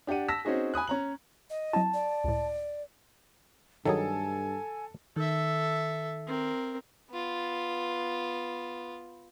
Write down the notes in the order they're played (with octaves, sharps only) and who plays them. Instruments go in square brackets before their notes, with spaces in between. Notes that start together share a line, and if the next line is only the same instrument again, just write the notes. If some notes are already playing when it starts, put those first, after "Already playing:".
[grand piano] D4 G4 D5 F#5 D#7
A5 E6 A#6 B6 E7
C4 C#4 D#4 F#4 G#4
G#5 B5 D#6 F#6
C#4 A#5 F#7
[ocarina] D#5
[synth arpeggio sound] F#3 C4 E4 [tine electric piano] A5
[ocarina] D5
[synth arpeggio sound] C#2 A2
[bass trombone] G2 [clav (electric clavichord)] D#3 F#3 G#4 [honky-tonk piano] A4 [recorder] G#5
[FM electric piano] D#3 [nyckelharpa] A4 E5
[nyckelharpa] C4 A#4
[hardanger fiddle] B3 F4